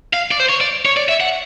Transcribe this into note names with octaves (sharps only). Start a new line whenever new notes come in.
F5
D5
C5
C#5
D5
C#5
D5
E5
F#5